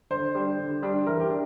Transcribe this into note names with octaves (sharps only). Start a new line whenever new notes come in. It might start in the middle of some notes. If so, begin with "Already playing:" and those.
D3 C5
G3 D4
D3
G3 D4
E3 A#4
G4
D4